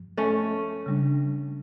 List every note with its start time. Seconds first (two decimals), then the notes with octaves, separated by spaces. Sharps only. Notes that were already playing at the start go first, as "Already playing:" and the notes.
Already playing: G2 F3
0.17 A3 C#4
0.86 C#3 G3 D4